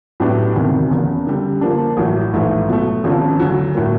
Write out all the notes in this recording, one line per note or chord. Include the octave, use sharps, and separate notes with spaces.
A2 F#3 B3 D4 G4
E1 D2 C3 D#3
F#1 E2 C#3
F#2 D3 G3
D3 F3 A#3 D4
A1 A2 F#3
A#1 G#2 E3 A3
B2 F#3 A3
G#1 F#2 C#3 F3
D2 D3 F#3
A2 F#3 A#3